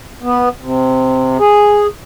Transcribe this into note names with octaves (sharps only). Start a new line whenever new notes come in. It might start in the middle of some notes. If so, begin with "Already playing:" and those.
B3
C3
G#4